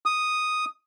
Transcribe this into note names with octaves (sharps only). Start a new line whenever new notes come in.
D#6